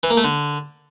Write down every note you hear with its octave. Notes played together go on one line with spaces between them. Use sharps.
E3
A#3
A3
D3